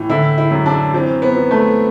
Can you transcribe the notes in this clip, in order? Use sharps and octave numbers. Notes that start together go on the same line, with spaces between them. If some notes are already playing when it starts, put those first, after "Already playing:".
Already playing: A2 E3
D3 E4
E4
F#2
D4
E3 C4
B3
E3
A3